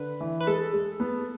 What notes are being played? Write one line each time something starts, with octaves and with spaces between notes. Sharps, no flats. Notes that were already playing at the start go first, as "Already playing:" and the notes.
Already playing: D3 B4
E3
B4
G#3 A4
G#3
B3